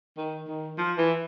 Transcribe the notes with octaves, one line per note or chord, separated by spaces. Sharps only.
D#3
D#3
F3
E3